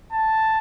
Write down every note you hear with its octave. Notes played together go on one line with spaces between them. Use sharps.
A5